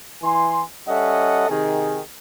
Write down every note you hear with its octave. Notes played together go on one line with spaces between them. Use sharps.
E3 G#5 C6
G3 C#4 A4 D#5 E5 F#5
C3 D#3 G#4